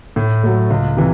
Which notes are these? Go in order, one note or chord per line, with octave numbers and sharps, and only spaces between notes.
A2
F#3 A3
C#2
C3 E3